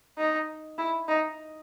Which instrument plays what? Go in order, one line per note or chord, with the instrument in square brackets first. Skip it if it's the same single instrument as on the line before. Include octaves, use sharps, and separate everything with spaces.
[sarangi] D#4
E4
D#4